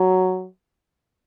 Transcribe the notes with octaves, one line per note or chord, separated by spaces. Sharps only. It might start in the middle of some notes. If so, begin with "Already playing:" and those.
Already playing: F#3